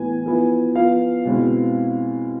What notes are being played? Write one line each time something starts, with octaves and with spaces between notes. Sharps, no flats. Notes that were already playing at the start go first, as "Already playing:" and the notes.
Already playing: A2 E3 B3 G#5
F3 B3 E4
F3 B3 F4 F5
B2 G#3 C4 E4